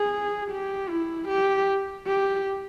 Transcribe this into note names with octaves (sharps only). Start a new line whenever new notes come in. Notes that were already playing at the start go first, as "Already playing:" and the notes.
Already playing: G#4
G4
E4
G4
G4